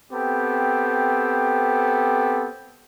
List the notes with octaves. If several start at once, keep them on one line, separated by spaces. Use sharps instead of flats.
B3 C4 G4 A4